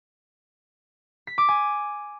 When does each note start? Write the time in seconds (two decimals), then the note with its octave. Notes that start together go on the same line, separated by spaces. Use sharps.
1.27 B6
1.38 D6
1.49 G#5